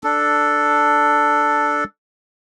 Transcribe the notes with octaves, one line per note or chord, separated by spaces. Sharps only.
D4 A4